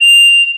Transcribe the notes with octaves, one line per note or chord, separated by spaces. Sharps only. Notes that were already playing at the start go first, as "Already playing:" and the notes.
F7